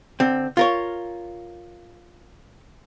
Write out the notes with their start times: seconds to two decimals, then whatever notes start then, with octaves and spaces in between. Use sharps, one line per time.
0.20 D3 C4
0.57 F4 A#4 C#5